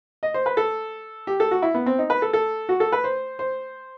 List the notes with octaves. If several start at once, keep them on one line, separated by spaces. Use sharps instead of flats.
D#5
C5
B4
A4
G4
A4
F#4
E4
B3
C4
D#4
B4
A4
A4
F#4
A4
B4
C5
C5